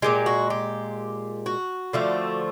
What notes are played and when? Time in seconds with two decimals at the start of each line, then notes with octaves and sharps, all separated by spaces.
0.02 A#2 F3 G#3 G4
0.26 F#4
0.50 G4
1.46 F#4
1.93 D3 F3 A3 C4